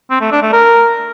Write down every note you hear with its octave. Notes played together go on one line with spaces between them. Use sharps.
C4
A3
D4
A3
A#4